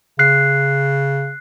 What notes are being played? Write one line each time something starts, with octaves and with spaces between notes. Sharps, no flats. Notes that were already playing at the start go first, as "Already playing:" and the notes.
C#3 F#6 C7